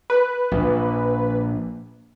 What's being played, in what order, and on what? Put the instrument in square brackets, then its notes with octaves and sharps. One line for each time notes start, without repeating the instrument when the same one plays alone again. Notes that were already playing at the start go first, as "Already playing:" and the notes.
[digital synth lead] B4
[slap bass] A#1